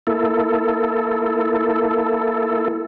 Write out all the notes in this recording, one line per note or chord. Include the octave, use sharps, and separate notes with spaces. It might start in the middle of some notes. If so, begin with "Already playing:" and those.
A#3 E4 A4